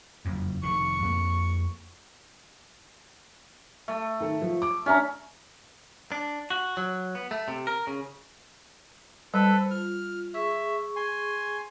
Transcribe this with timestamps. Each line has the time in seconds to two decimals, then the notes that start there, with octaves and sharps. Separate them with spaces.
0.25 F#1 F2
0.63 F1 D#3 C#6
1.02 F2 A#3
3.88 A3
4.20 D#3 A4
4.42 F3
4.62 D6
4.86 C#4 D4 E5 A#5
6.12 D4
6.50 F#4
6.77 F#3
7.15 B3
7.31 A3
7.48 C3
7.67 A#4
7.87 C#3
9.34 G3 A4 B4 C5
9.71 F4 F6
10.34 G#4 E5 C#6
10.96 G#5 C6